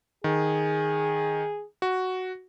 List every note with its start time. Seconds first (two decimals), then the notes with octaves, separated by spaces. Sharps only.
0.24 D#3 G#4
1.82 F#4